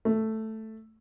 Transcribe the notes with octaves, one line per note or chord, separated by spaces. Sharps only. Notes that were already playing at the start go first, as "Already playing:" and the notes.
A3